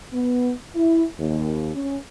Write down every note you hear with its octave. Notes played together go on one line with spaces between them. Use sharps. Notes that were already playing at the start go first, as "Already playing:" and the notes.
B3
E4
D#2
C#4